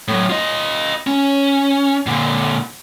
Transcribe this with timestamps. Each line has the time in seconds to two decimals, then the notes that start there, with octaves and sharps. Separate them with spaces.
0.08 A2 F#3
0.30 F4 D#5
1.07 C#4
2.06 A#2 D3